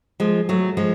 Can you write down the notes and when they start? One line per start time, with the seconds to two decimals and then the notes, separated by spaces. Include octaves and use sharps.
0.20 F3 G#3
0.49 F#3 A3
0.77 F3 G#3